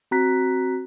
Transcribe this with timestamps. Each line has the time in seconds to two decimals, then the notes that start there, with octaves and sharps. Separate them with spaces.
0.11 C4 F#4 A#5 F#6 B6